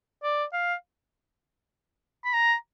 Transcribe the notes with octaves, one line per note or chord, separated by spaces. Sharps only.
D5
F5
B5
A#5